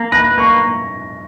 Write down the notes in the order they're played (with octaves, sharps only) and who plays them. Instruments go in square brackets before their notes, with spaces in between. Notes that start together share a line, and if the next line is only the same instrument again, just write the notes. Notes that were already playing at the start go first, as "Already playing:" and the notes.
Already playing: [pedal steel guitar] A#3
[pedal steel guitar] B4 [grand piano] A#6
[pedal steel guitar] A#3 [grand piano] C#6